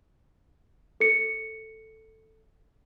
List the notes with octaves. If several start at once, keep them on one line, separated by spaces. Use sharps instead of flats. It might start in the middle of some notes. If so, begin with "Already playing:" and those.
A4 C#7